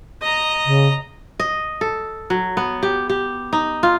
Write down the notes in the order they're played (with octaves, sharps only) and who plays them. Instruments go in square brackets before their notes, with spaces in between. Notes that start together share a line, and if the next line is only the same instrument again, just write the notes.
[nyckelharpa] D#5 A#5
[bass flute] C#3
[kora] D#5
A4
F#3
B3
G4
G4
D#4
F4